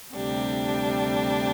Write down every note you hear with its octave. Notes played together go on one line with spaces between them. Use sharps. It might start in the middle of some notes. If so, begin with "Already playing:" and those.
D2 C3 G3 D4 G4